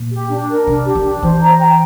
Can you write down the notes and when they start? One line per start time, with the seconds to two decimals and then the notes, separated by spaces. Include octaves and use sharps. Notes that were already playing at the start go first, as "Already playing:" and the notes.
Already playing: A#2
0.12 G4
0.30 D4
0.49 A#4
0.67 C3 D4
0.86 G4
0.95 D3
1.04 D4
1.22 E3 C5
1.41 A#5
1.59 G5